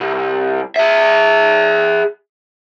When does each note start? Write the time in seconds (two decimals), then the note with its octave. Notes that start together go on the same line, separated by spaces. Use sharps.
0.01 C2
0.76 G#4 E5